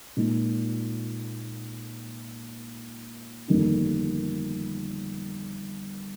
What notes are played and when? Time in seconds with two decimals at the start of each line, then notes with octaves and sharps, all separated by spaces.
0.17 A#2 G#3 D#4
3.48 G1 F2 D#3 A#3 D#4